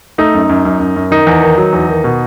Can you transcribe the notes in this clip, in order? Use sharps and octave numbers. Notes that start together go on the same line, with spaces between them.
A3 D#4
F#2
F#2
F#2
F#2
F#2
D#3 D#4
E2
D#3
F#3
E2
D#3
B2